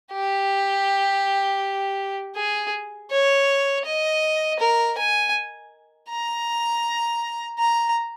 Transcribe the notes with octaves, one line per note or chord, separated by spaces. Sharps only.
G4
G#4
C#5
D#5
A#4
G#5
A#5
A#5